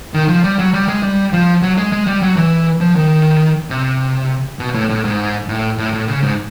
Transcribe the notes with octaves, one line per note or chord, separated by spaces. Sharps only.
D#3
F3
G3
F#3
G3
G#3
G3
F3
F#3
G#3
G#3
G3
F#3
E3
F3
D#3
C3
B2
A2
A2
G#2
A2
A2
A2
C#3
G#2